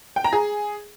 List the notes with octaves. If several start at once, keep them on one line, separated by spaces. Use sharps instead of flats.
G5
A#5
G#4